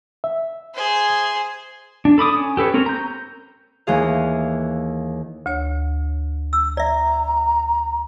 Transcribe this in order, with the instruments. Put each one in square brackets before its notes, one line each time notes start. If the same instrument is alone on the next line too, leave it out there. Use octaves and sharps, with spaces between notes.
[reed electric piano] E5
[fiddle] G#4 C5
[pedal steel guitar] D4
A4 B5 D6 D#6
C#4
G4 A4 B4 C#5
C4 C#4 A#4
A#5 G6
[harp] D#2 E3 G#4 F5
[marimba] D2 C#5
[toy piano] E6
[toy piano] D5 E5 [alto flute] A#5